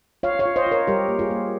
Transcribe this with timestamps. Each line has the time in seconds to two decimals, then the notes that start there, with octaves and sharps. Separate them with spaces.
0.23 F4 C#5 F5
0.39 C#5 F5
0.45 F4
0.56 C5 D#5
0.66 F4
0.71 A#4 C#5
0.87 G3 G4 A#4
1.08 A#3
1.19 F4 G#4
1.31 A#3